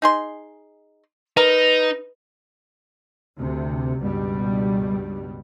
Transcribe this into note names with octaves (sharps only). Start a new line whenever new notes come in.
D#4 G#4 C6
D#4 A#4 B4 A#5
D2 C3
C#2 G2 B2 G3